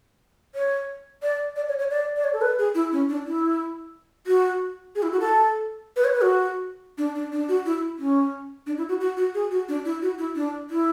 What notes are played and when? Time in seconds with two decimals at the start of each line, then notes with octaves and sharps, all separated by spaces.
0.55 C#5
1.23 D5
1.56 D5
1.68 C#5
1.79 C#5
1.91 D5
2.16 D5
2.24 C#5
2.33 A4
2.42 B4
2.59 G#4
2.75 E4
2.92 C#4
3.09 D4
3.26 E4
4.27 F#4
4.95 G#4
5.03 E4
5.12 F#4
5.20 A4
5.96 B4
6.04 C#5
6.14 B4
6.21 F#4
6.98 D4
7.15 D4
7.32 D4
7.49 F#4
7.66 E4
7.99 C#4
8.67 D4
8.78 E4
8.89 F#4
9.00 F#4
9.17 F#4
9.34 G#4
9.51 F#4
9.68 D4
9.85 E4
10.02 F#4
10.18 E4
10.36 D4
10.70 E4